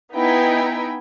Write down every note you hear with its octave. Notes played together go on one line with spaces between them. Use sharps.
B3 D#4 E4 G5 G#5